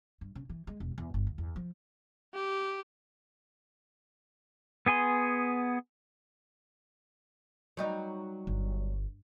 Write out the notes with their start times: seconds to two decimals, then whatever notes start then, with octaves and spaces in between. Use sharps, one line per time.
0.21 G2
0.35 C#3
0.49 E3
0.67 G#3
0.80 E1
0.98 E2
1.14 G1
1.27 D2
1.38 E2
1.56 F3
2.34 G4
4.86 B3 G#4 G#5 C6
7.77 F#3 G3 D#4
8.47 G1